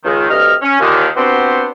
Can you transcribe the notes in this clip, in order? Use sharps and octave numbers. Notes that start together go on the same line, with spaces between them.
C#2 D#3
D2 G2 C3 D#5 F6
C#4
D#2 A#2 D3 D#3
B3 C4 D4 F#4 G4 C5